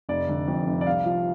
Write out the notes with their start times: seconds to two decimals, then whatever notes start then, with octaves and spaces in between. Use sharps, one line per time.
0.09 F1 D5
0.28 D3
0.47 F2
0.67 F1
0.81 D5
0.86 C2 F5
1.06 F3